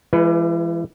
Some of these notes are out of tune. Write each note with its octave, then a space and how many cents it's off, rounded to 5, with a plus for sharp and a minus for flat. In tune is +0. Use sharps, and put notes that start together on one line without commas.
E3 +40 G#3 +0 B4 +0